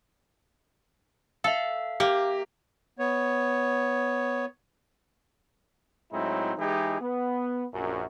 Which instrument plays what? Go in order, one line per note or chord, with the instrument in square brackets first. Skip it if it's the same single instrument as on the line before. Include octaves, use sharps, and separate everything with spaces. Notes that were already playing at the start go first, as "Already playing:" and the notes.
[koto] A4 [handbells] E5 F5
[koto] A#3 [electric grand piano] G4
[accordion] B3 C#5
[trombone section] A2 F#3 G#3 C4 D#4 E4
E3 G#3 D#4 E4 G4 G#4
B3
A#1 F#2